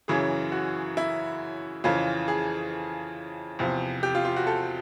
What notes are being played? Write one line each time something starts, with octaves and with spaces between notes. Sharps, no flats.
F#2 C#3 E3 G#4
F#4
E4
F2 C#3 E3 F4
G#4
E2 C3 F3
G4
F4
F4
F#4
A4